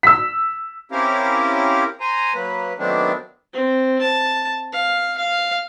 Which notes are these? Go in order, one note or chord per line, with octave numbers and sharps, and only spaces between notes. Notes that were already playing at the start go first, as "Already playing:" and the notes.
E6 B6
C4 C#4 E4 G4 A#4 F5
C5 G#5 A#5
F#3 A#3 B4
D#3 F#3 A3 B3 C4 D4
C4
A5
F5
F5